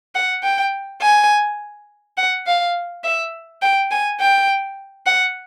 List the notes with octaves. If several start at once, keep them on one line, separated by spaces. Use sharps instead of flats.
F#5
G5
G#5
F#5
F5
E5
G5
G#5
G5
F#5